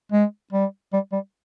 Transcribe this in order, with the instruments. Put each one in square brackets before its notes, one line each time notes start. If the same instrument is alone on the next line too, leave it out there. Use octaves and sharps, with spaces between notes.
[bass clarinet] G#3
G3
G3
G3